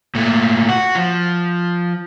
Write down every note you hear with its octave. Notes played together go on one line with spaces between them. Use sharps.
A#2 A3
F#4
F3